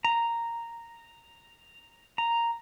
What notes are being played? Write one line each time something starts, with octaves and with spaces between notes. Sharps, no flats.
A#5
A#5